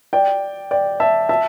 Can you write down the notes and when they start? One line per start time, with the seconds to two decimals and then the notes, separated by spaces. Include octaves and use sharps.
0.13 D5 G5
0.71 D5 G5
1.00 E5 A5
1.29 E5 A5